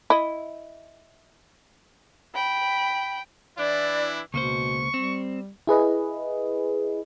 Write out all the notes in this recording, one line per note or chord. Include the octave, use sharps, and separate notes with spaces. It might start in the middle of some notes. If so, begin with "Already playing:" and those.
E4 D#5
G5 B5
E3 D4 E4 D5
C#2 B2 A#3 C5 C#6
G3 C4
E4 G#4 B4 D#5